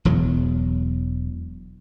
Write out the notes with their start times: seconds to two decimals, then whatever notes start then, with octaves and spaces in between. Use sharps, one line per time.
0.05 E1 E2 F#3